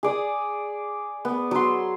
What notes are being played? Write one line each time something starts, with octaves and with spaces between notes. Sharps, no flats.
G#4 D5 D#6
B3
F#3 C6